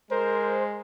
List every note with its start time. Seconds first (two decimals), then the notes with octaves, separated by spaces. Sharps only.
0.11 G#3 A#4 C5